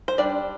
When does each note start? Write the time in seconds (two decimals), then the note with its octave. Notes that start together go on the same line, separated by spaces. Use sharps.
0.08 C5
0.18 G3 D4 D5